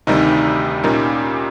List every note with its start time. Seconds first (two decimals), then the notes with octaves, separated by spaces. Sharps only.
0.07 D2 C3 D#3 G3 D#4
0.84 A#2 G3 A#3 C#4 D#4